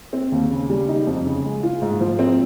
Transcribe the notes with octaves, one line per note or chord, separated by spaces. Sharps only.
C4
D#2
C#3
G3
D#4
F2
C#3
G#3
F4
G#2
F3
C4